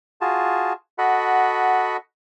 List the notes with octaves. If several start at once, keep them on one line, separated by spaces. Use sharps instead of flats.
F4 F#4 G#4 A5
F#4 A4 D#5 F#5 B5